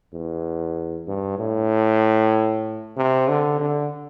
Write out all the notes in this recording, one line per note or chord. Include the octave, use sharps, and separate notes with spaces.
E2
G2
A2
C3
D3
D3